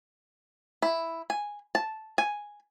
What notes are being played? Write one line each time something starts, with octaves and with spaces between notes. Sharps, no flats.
E4
G#5
A5
G#5